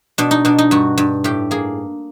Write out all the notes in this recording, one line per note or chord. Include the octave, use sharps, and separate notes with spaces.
B2 D4
D#4
B2 D4
D#4
G2 F#4
G2
A2 G4
A#3 G#4